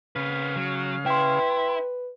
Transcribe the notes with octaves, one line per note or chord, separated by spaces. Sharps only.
C#3 C4 B4 F5
F#3
E4 B4 G5 C6